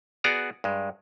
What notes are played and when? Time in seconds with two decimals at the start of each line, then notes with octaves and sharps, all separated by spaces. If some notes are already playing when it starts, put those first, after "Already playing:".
0.24 B3 F#4 G#4 D5 A#5
0.64 G2 G#3